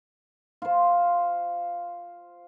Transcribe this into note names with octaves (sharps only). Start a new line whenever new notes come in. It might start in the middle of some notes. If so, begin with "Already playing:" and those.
F4 C5